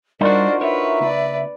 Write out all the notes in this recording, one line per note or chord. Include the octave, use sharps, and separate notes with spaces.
G3 D4 D#4 F4 F#4 A#4 C5 D5
A#4 B4 C#5 E5
C#3 A#3 B4 D5